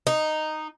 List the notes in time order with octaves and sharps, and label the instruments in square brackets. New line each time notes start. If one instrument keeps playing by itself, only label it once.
[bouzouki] D#4